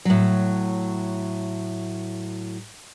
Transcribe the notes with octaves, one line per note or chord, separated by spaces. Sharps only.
A2 F#3